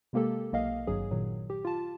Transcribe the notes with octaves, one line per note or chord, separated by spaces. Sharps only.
C3 G#3 A#3 G4 A4
B1 A#3 D#5 F5
G#1 G2 F#3 G#4
A#2 D#3 F#3
G4
F4 A5